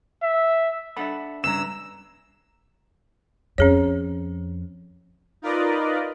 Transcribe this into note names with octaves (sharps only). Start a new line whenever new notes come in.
E5
D4 A4 E5 F#5 B5
G2 C#3 B4 A#5 E6 E7
F2 C#4 G#4 C#5
D#4 F4 A#4 B4 D5 D#5